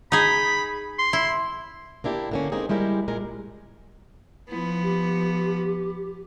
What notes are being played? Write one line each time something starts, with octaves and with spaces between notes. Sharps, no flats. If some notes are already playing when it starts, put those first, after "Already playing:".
D#4 G#4 B5
C6
E4
A#3 D4 E4 G4
D3 A#3 C#4
G#3 A#3 C4 D#4 G#4
G3 G#3 E4 G4 A#4
A#2 G#3 A#4
F3 B3 E4
G4